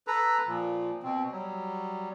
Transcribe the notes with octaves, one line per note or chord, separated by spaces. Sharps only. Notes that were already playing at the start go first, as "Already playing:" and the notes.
A4 B4 A#5
A#2 F3
B2 C4
F#3 G3